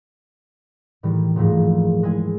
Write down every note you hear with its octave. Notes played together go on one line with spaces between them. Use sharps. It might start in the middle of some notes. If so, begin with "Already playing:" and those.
A2 D#3 E3 G3
D#1 G#2 F3 A3 A#4
G#3 E4 G#5